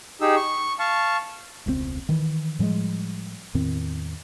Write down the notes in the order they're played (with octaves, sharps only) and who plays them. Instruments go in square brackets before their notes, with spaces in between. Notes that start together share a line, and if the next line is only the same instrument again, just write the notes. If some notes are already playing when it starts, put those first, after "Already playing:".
[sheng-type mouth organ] D#4 G4 G#4 E6
C#6
F5 A5 C#6
[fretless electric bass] E1 C#2 D#3 C4
D#3 E3
A2 F3 G3 G#3
E2 A2 D#3 C4